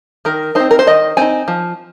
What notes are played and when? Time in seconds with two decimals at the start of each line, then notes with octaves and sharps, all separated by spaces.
0.25 D#3 A#4
0.55 C4 D#4 C5
0.71 A#4
0.79 C5
0.87 D#3 D#5
1.17 C4 D#4 G#5
1.48 F3